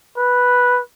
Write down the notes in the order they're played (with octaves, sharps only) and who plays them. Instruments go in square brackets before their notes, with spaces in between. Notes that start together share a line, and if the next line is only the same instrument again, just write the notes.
[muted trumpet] B4